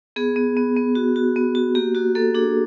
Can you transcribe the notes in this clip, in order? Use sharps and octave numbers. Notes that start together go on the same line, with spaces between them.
B3 G#4
B3
B3
B3
F#4
F#4
B3
F#4
A#3 G4
A#3 F#4
A#3 A4
D4 G#4